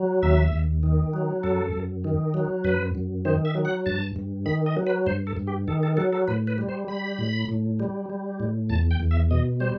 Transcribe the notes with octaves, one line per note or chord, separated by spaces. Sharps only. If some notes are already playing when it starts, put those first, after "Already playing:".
Already playing: F#3
D#2 E5
D#2
D#3
F#3
F#2 A4
F#2
D#3
F#3
F#2 B4
F#2
D#3 C5
E5
F#3
F#5
G2 A5
G2
D#3 B5
D#5
F#3
B4
G2 C5
A4
G2
G4
D#3 A4
A4
F#3 A4
A4
A2 B4
B4
G3
C5
G3 B5
A2
A2
G3
G3
A2
E2 A5
G5
E2
E5
B2 D#5
G3 C5